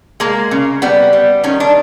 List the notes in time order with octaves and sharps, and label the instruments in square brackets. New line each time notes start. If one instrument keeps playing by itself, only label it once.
[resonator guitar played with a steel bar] G#3 A#3
C#3
G3 B3
G3
D#3 C#4
D4